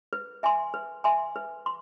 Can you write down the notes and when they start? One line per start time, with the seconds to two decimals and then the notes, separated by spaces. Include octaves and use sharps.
0.13 B4
0.43 E5 G#5 C6
0.74 B4
1.04 E5 G#5 C6
1.36 B4
1.66 C6